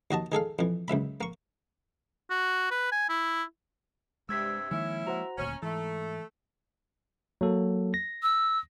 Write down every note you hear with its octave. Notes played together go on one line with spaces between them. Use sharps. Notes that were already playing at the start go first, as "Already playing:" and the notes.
D#2 F#4 D#5 A5
D#3 G#4 A4 F5
F2 E3
C#2 F#2 E5 B5
A#3 C#6
F#4
B4
G#5
E4
G2 C3 G#3 E6 G#6 B6
D#3 F3 G#3 A#3 C#4 E4
F#4 C5 F#5 A#5
D#1 D2 A#2 C#4
G#2 E3 A3
F#3 A#3 A4
A#6
E6